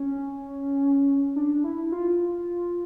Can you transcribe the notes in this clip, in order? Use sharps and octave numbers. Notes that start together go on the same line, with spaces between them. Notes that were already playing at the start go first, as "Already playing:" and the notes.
Already playing: C#4
D4
E4
F4